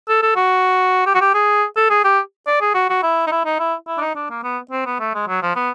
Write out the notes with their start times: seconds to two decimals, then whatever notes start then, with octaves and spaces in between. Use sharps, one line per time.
0.08 A4
0.22 A4
0.36 F#4
1.06 G4
1.14 F#4
1.21 G4
1.34 G#4
1.76 A4
1.90 G#4
2.04 G4
2.47 D5
2.61 G#4
2.75 F#4
2.89 F#4
3.03 E4
3.27 D#4
3.32 E4
3.45 D#4
3.59 E4
3.87 E4
3.97 D4
4.01 D#4
4.15 D4
4.30 A#3
4.43 B3
4.71 C4
4.86 B3
5.00 A3
5.14 G#3
5.28 F#3
5.42 F3
5.55 B3